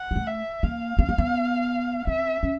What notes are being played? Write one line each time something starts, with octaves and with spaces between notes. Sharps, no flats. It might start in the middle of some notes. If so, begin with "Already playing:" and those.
Already playing: F#5
G#3
A3
E5
A#3 F5
B3
A#3
B3
C4 E5
C#4